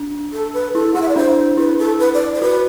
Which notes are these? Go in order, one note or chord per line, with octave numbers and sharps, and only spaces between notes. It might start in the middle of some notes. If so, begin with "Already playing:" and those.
Already playing: D4
A4
B4
E4 A4
E4 F#5
E5
D5
D4 C5
E4 B4
A4
B4
D5
C5
F#4 B4